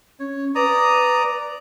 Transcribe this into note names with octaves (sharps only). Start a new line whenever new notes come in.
C#4 C#5
B4 D5 A#5 D#6